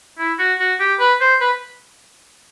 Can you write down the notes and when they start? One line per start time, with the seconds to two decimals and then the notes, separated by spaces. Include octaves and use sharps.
0.19 E4
0.39 F#4
0.59 F#4
0.80 G4
1.00 B4
1.21 C5
1.41 B4